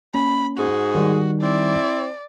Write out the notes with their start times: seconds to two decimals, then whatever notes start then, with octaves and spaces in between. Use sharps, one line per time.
0.14 A#3 C#4 B5
0.58 G#2 F#4 G#4
0.95 D#3 G3 D#4
1.41 C4 E4 D5